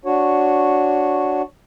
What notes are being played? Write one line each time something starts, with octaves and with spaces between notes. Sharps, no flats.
D4 F#4 C#5